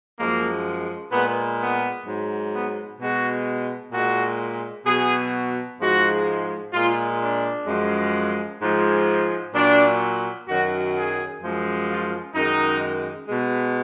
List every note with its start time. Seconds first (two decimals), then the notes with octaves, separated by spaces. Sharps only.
0.18 F#2 F3 G#3 A#3
1.11 A#2 G#3 B3
1.59 B3
2.05 G#2 F#3
2.52 B3
2.99 B2 G#3 F#4
3.92 A#2 G#3 F#4
4.86 B2 F#3 G#4
5.79 G#2 F3 G#3 F#4
6.73 A#2 G#3 F4
7.20 D4
7.67 F#2 F3 G#3
8.60 G#2 F3 G#3
9.54 A#2 F#3 D4
10.47 F#2 D#3 F#3 F#4
10.95 G#4
11.41 F#2 F3 G#3
11.88 F4
12.35 F#2 D#3 G#3 D#4
13.29 B2 G#3